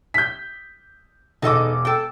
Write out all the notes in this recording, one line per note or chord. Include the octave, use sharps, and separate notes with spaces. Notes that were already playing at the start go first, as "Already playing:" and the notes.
G6 B6
E1 D#4 A4 D#5 D6
A4 G5